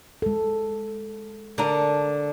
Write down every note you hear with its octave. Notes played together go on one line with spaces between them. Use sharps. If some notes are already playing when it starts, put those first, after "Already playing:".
G#3 A4
D3 D4 A#4